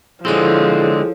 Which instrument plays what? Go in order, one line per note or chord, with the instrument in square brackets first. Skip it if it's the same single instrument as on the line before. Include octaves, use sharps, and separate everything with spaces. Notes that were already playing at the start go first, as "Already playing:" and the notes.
[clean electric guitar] D3 G#3 C4 [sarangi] F3 [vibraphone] E4 A4 C#5 [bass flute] G#4